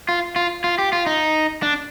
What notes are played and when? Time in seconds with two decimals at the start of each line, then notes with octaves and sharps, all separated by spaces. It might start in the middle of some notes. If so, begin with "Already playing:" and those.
0.09 F4
0.36 F4
0.64 F4
0.78 G4
0.93 F4
1.06 D#4
1.63 D4